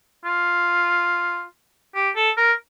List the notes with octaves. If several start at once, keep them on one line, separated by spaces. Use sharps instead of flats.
F4
G4
A4
A#4